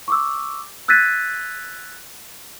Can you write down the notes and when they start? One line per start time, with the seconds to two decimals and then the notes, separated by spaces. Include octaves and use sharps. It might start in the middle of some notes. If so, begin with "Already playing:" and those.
0.08 C#6 D6 E6
0.88 E6 F#6 G#6 A6 B6 D#7